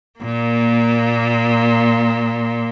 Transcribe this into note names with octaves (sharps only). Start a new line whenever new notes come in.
A#2 A#3